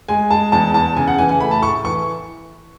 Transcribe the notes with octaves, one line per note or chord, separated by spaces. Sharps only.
G#3 G#5
G#3 A5
E2 A5
E2 A5
C#3 G#5
F#5
E3 G#5
G#5
A3 B5
A5
A2 C#6
E3 C#6